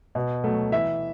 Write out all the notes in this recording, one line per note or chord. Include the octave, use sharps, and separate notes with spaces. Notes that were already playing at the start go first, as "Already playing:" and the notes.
B2
F#3 A3
E3 E5